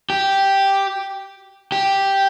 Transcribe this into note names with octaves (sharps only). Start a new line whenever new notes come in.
G4
G4